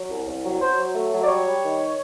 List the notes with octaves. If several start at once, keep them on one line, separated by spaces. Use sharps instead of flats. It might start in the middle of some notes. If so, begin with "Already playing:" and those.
Already playing: F#3
C2
C2
F#3
F#3 C5
F#3
A3
F#3
D5
G3 C#5
G3
D#3